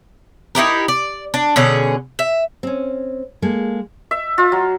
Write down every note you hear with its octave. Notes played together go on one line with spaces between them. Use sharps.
D#4 E4 G4 A#4
D5
D4
B2 D3 C#4 G#4
E5
C4 C#4
G#3 A#3 A4
E5
F4
F#3